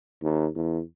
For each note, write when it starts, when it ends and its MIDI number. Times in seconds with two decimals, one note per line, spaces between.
0.23 0.48 39
0.56 0.82 40